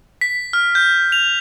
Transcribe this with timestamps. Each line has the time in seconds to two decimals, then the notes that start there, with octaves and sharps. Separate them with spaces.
0.21 B6
0.53 F6
0.75 G6
1.12 F7